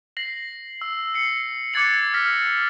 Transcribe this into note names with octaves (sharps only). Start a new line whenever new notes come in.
A#6 C7 F#7
E6
C7 C#7
D6 F#6 G#6 A6 C#7 F#7
F6 A#6 B6